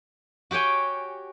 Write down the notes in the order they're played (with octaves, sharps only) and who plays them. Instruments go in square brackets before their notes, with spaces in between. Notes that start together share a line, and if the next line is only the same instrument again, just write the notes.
[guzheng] F#4 G4 C#5 G5 G#5